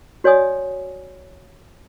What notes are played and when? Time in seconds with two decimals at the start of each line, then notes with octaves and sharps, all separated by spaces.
0.24 F#4 C#5 D5 G#5 D#6